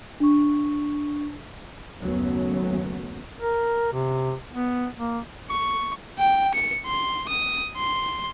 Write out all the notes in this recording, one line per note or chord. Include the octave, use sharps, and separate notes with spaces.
D4 C#6
F#1 D#2 F#3 A3 B3 C#4
A#4
C3
B3
A#3
C#6
G5
C#7
C6
D#6
C6